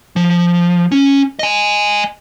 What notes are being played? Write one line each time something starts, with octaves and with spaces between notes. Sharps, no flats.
F3
C#4
D#5 G#5